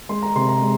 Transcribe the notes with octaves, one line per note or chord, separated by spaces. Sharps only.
G#3 C6
A#5
C3 C6
A#5
G#3